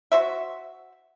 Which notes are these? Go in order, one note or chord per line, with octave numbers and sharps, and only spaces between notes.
F#4 C5 E5